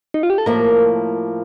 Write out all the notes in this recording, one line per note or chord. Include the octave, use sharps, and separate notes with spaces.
D#4
F4
G4
A4
A2 F3 A#3 A#4